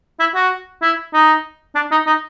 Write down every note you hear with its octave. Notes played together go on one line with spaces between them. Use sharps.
E4
F#4
E4
D#4
D4
D#4
D#4